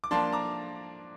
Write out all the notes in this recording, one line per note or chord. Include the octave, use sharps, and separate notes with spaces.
D6
F3 A#3 D4 A5 C6
A#5 D6